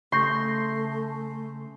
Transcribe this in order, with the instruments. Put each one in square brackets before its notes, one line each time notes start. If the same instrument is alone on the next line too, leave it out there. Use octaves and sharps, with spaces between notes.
[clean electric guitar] C#3 [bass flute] A3 [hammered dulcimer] C6 [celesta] C#6 G6 A#6